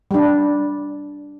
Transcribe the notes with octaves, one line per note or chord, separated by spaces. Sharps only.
G3 D4